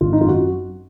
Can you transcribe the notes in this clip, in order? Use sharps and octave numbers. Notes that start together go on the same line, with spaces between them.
G#1 F4
D#4
F#2 F4
F#4